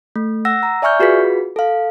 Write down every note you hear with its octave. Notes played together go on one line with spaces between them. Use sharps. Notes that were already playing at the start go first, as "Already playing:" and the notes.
A3
F#5 E6 A#6
A#5
D5 E5 G#5 C#6 F6 G6
F4 F#4 G#4 B4 B6
A4 F5